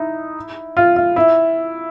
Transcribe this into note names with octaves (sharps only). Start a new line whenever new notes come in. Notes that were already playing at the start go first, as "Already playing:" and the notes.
Already playing: D#4 E4
F4
F4
E4